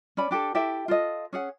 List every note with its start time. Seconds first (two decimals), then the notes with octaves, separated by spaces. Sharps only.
0.17 C#4 D5 B5
0.31 D4 G4 A4
0.55 E4 G4 A4 E5
0.88 F4 A4 D#5
1.33 C#4 G#4 F#5